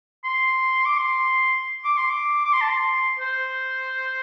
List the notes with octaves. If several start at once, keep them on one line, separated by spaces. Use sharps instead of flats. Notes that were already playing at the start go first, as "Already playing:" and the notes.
C6
D6
C6
D6
C6
D6
D6
C6
A5
C6
C5